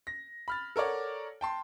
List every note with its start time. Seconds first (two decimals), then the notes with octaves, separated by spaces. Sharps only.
0.07 A#6
0.48 B5 F6 A6
0.76 A4 A#4 C#5 D5 F#5
1.41 G5 A5 C6